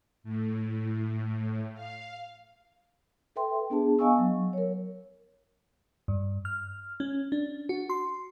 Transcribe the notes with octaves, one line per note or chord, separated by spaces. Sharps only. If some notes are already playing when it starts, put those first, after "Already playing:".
A2
F5
A4 B4 E5 G5 C6
B3 D4 G#4 A5
B3 D#5 F5 G#5 C#6 E6
F#3
A#4 C#5
G2
F6
C#4
D4
F#4
C6